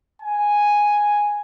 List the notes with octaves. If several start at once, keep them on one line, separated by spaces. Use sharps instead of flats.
G#5